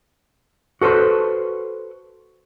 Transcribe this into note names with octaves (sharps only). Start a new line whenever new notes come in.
F#4 A4 B4 C5